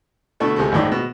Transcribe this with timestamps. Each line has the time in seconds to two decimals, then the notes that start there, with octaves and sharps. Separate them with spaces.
0.40 B2 D3 A3 E4 A4
0.56 C#2 C3 G#3 A4
0.72 G#1 F2 A2 D#3 D5
0.88 B2 G#3